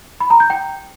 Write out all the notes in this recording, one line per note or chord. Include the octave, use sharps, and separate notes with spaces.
B5
A#5
G6
G5